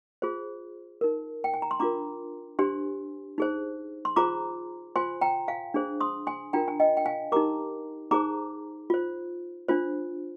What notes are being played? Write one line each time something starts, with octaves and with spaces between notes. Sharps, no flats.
F4 G#4 C5
D#4 A#4
G5
G#5
A#5
C6
D4 F4 A#4 A#5 D6
D4 G4 C5 G#5 C6
D#4 G#4 C5
C6
F4 G#4 C5 A#5 D6
F4 C5 G#5 C6
G5 A#5
F5 G#5
D4 G#4 C5
C6 D#6
G#5 C6
D4 F4 A#4 G5 A#5
G#5
D#5 G5
G5
F5 G#5
D#4 G4 A#4 A#5 D6
D#4 G#4 C5 A#5 D6
F4 C5
D4 F4 C5